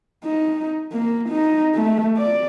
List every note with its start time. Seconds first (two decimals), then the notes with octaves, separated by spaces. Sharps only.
0.24 D#4
0.92 A#3
1.29 D#4
1.75 A3
2.17 D5